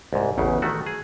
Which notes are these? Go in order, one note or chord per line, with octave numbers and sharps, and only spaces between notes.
C2 G#2
A1 E2 C#3
D#3 A3 F#4
G#4